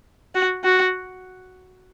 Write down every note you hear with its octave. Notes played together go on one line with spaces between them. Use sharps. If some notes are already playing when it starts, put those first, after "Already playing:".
F#4
F#4